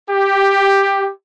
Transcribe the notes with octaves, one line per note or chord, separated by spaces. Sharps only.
G4